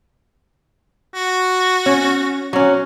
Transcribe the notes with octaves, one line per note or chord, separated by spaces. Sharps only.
F#4
C#4
F#3 C#4